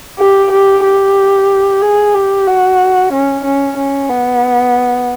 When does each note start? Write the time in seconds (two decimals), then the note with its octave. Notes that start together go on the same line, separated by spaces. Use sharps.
0.19 G4
0.51 G4
0.84 G4
1.82 G#4
2.15 G4
2.47 F#4
3.12 C#4
3.44 C#4
3.76 C#4
4.09 B3